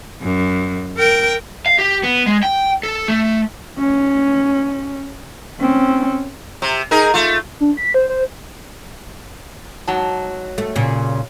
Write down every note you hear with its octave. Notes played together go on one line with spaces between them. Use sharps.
F#2
A#4 G5
F5
G4
B3
G#3
G5
A4
A3
C#4
C4 C#4
C3
D#4 G#4 A#4
A3 F4
D4
B6
C5
C5
G#2 F#3 A5
A3
A#2 C#3